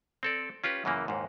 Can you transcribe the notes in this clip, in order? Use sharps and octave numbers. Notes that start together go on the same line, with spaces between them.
C4 A4 D5
C#4 F4 G4 B4
F#2 C#3 E3 A#3
D#2 G#2